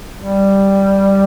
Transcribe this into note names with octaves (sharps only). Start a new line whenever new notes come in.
G3